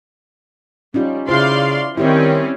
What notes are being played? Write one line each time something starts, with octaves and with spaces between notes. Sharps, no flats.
G3 C#4 D#4 F4
C#3 E4 F4 C5 D5 F5 C6
D#3 G3 C4 C#4 E4 G4 C#5